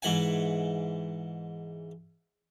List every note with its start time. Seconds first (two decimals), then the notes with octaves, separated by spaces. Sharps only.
0.02 G#2 E3 F#5 G#5